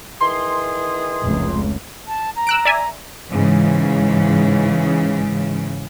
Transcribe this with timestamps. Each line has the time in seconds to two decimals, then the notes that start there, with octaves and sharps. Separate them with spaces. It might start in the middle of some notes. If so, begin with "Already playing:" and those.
0.21 D#3 E3 G#4 C6
1.23 F1 C#2
2.07 A5
2.35 A#5
2.47 E6 F#6 D7
2.65 D5 E5 G#5
3.30 G#2 C#3 E3